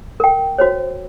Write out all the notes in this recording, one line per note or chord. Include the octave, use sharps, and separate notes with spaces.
A#4 G5
F#4 C5 C#5